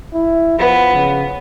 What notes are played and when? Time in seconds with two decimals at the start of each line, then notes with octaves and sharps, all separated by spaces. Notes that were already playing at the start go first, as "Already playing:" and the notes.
0.14 E4
0.59 F3 B3
0.93 C#3